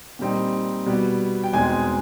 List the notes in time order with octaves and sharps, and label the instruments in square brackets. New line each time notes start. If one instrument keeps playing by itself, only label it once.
[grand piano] A#2 G3 C4 D#4
B2 G3 B3
G5
E2 B2 G#3 C4 D#4 G#5